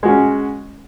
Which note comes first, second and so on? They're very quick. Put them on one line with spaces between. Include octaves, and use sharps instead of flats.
G#3 F#4 C#4